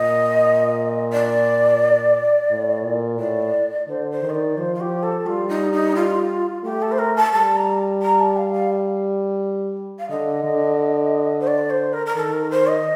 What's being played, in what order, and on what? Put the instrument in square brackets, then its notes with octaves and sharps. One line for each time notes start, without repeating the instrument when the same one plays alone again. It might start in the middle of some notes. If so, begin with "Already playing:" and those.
Already playing: [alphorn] A#2 [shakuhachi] D#5
[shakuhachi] D5
[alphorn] A2
A#2
[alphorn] A2 [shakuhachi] D5
[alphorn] D3 [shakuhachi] C5
[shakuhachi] C5
[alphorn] D#3
[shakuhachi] D#5
D5
[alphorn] F3 [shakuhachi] C5
[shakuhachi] F4
G4
A4
[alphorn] G3 [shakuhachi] F4
[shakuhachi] D#4
D#4
F4
[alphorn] A3 [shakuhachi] G4
[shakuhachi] A4
C5
A#4
A5
[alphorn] G3 [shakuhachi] A5
[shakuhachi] A#5
A#5
A5
F5
F5
F5
[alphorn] D3 [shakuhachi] D#5
[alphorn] D3
[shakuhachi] C5
D5
C5
A#4
A#4
[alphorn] D#3 [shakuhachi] A4
[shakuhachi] A#4
C5
D#5